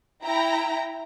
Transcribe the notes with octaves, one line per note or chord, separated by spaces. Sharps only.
E4 G5 A#5